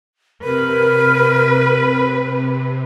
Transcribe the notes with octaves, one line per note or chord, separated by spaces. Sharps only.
C3 A#4 B4